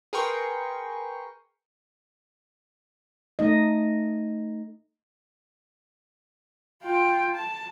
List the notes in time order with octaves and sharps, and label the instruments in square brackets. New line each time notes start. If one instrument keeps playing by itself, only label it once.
[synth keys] G#4 A#4 B4 G5 C6 C#6
[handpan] A3 D#4 D#5
[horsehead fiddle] F4 G5
A5